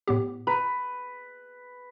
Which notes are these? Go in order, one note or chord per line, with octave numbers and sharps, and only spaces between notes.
A2 B3 G4
B4 A#5